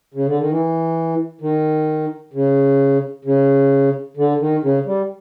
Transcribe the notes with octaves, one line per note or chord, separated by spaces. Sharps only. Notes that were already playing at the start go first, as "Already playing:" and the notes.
C#3
D3
D#3
E3
D#3
C#3
C#3
D3
D#3
C#3
G3